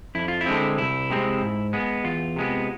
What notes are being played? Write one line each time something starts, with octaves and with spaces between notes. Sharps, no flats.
F2 E4
F4
E4
D3 G#3 C4
C2 E4
C3 G#3 C4
G#2
G#3 B3
E2 F4
C3 G#3 B3